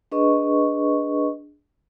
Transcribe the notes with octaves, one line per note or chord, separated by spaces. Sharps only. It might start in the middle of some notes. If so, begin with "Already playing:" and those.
D4 G#4 B4 D#5 C#6